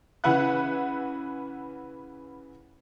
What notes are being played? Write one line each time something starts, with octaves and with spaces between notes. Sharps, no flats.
C#3 E3 E4 B4 F#5 F#6